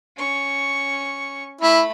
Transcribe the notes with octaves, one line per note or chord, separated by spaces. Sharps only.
C#4 C#6
A3 E4 B5